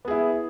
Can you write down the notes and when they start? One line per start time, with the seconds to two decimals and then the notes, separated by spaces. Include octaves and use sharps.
0.05 B3
0.08 G#4
0.11 E4